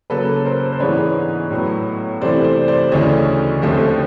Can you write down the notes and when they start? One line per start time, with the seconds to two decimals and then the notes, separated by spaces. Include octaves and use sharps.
0.10 C#3 F#3 A#3 A4 B4
0.45 A#4 C5
0.72 C5
0.80 G#2 E3 G#3 B3 D4 B4 C#5
1.51 A2 F#3 B3
2.21 C3 E3 A3 C5 D5
2.44 C5 D5
2.68 C5 D5
2.92 D2 C#3 E3 A3 D4 C#5 D#5
3.62 D#2 D3 F3 A3 C4